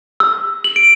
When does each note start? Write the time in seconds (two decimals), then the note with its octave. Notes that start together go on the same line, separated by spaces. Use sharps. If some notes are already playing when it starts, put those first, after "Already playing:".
0.20 E6
0.64 F#7
0.76 D7